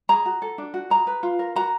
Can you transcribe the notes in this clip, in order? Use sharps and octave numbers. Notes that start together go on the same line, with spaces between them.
G#4 A#5
F#4
A4
D4
F#4
G#4 A#5
B4
F4
A#4
F#4 A#5